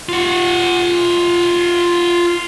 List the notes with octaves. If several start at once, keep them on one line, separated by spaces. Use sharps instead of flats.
F4 F#5